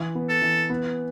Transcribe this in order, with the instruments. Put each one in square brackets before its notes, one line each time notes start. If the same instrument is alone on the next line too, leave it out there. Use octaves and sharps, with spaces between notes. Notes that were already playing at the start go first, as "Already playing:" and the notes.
Already playing: [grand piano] E3
B3
[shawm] A4
[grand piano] E3
B3